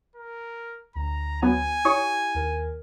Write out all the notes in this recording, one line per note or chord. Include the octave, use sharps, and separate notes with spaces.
A#4
D2 A#5
F#3 B3 G#5
E4 G4 C#5 C#6 D#6
D#2 A#4